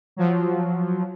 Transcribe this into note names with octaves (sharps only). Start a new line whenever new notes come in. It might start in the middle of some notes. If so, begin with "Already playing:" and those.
F3 F#3